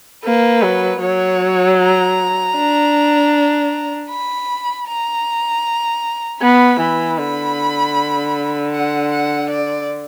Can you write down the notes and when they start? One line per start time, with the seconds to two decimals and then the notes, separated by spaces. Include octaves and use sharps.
0.24 A#3 B4
0.62 F#3
1.01 F#3 C#5
1.79 A#5
2.56 D4
4.10 B5
4.87 A#5
6.41 B3 B5
6.80 E3
7.18 D3 B5
8.73 F#5
9.12 F#5
9.50 D5